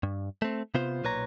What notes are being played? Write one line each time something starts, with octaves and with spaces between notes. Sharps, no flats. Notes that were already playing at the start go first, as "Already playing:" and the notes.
G2
A3 C4
C3 B3 F4 C5
B1 A#2 B4 C#5 A#5